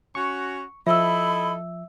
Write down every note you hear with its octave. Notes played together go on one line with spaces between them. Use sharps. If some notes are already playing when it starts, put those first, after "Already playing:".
C#4 F#4 C#6
F3 E4 A4 D#5 E5 B5 E6